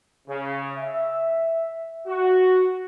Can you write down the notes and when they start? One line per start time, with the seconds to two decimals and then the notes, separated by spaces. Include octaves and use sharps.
0.28 C#3
0.77 E5
2.06 F#4